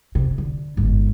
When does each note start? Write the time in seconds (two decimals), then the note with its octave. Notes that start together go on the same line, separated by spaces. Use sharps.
0.15 C3
0.38 D3
0.77 G1 G#2